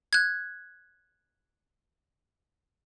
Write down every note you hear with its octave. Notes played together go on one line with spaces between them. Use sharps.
F#6 G#6